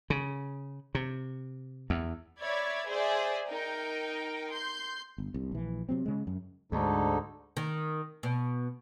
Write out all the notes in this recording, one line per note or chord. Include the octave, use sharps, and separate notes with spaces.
C#3
C3
E2
C#5 D5 E5 B5 G#6
G#4 C5 D5 E5
D#4 A#4 G5
C6 G6
G1
C2
A#1 E3
C3 F#3 C4
C#3 G#3
F#2
D2 G#2 D3 D#4 A4
D#3
B2